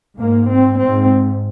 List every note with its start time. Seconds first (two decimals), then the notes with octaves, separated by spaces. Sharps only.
0.19 G#2 A#3
0.50 C4
0.81 G#2 C4